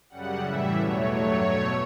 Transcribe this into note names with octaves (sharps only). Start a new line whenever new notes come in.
F#2 C#3 G3 F#5
A2 E3 G3 E5
E2 B2 F#3 A3 C#5
G2 F#3 A3 C#5
B2 A3